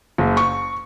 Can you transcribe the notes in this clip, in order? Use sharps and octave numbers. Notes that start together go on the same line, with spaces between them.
F#1
C#6